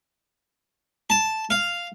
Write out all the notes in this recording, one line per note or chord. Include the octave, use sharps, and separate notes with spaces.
A5
F5